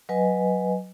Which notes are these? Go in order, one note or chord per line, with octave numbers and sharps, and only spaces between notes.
F#3 B4 D#5 G#5